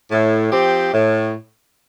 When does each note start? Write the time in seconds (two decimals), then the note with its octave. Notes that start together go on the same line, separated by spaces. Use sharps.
0.11 A2
0.51 F3 C4 G4
0.92 A2